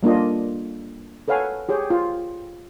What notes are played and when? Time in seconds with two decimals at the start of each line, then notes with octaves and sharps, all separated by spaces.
0.03 G3 A#3 D4 F4 D#5
1.28 A4 B4 C#5 F5 F#5 G#5
1.69 G4 G#4 C#5 G5
1.90 F4